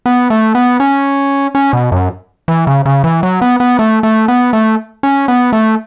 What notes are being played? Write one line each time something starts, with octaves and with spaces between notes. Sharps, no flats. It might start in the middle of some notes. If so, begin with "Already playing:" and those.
B3
A3
B3
C#4
C#4
B2
F#2
E3
C#3
C#3
E3
F#3
B3
B3
A3
A3
B3
A3
C#4
B3
A3